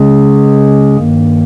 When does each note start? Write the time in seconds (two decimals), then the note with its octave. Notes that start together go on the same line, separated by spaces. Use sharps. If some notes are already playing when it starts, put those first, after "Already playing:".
Already playing: C#3 G#3 C#4 G#4
0.96 G2 D#3 A#3